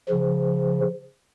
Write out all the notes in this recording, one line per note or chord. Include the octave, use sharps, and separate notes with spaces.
C#3 F3